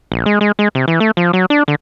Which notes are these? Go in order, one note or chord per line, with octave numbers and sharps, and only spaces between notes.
A#1
G#3
G#3
G#3
C3
E3
A3
F3
F#3
D4
D3